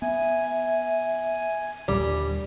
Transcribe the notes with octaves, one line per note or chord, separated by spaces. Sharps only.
B3 E5 G#5
D#2 A#2 D3 G3